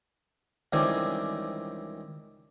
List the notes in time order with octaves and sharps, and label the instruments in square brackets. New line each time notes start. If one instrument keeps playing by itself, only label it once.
[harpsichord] C#2 D#3 E3 G3 C4 G#5